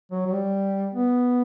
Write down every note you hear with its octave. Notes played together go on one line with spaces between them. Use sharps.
F#3
F#3
G3
B3